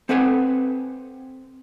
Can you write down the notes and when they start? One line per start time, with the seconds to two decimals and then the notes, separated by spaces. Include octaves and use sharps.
0.09 C4 A4 B4 F#5 G#5